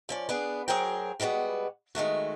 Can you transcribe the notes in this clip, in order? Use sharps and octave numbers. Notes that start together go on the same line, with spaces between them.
F3 C#4 D5
B3 D4 G#4
D2 F#3 G#4 A#4 C5 G5
B2 G3 G#3 B3 F#4
D#3 G#3 A3 F#4